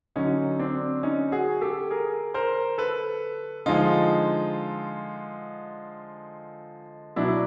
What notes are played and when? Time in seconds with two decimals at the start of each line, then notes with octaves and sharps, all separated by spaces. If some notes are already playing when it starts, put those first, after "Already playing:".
0.16 D3 F#3 C#4 D#4
0.59 C4 D4
1.03 C#4 D#4
1.32 F#4 G#4
1.61 G4 A4
1.90 G#4 A#4
2.34 A#4 C5
2.78 A4 B4
3.66 D3 F3 G#3 D#4 F4
7.16 B2 F#3 D4 E4